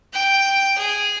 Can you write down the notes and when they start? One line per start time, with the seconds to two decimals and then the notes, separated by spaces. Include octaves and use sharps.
0.13 G5
0.78 G#4